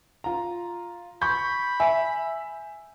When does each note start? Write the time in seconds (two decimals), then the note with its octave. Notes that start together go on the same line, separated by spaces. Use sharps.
0.24 F4 A#5
1.22 B5 C#6 G6
1.80 E5 G#5